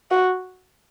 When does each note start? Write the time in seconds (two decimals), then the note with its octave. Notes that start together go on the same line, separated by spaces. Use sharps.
0.11 F#4